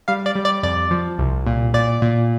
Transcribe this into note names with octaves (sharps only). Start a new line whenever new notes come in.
G3 F5
D5
G3
D5
F2 D5
F3
C2
A#2
A#2 D5
A#2